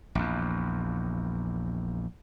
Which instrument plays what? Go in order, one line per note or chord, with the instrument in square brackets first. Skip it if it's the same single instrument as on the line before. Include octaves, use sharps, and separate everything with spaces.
[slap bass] A#1 E2